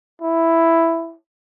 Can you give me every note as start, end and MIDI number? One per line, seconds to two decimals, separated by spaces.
0.22 1.16 64